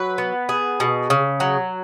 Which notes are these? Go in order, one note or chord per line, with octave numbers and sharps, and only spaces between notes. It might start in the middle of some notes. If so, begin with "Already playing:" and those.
Already playing: F#3 B4
B3
G#4
B2
C#3
F#3